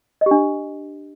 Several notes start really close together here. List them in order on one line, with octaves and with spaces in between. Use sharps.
D#5 G4 D4